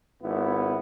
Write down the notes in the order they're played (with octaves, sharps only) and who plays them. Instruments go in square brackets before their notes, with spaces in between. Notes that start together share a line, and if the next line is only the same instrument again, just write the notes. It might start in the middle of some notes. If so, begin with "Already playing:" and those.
[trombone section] G#1 B3 E4